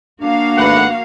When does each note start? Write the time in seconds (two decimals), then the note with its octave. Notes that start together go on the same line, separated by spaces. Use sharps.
0.21 A#3 D4 F#4 F5
0.57 G#1 A3 B4 F#5